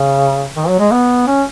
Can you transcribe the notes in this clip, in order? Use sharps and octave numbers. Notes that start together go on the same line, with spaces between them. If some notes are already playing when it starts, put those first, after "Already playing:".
Already playing: C#3
D#3
F#3
G#3
B3
C#4